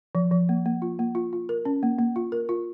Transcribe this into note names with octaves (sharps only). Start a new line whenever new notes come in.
F3
F3
A#3
A#3
F4
A#3
F4
F4
A#4
C#4
A#3
A#3
F4
A#4
F4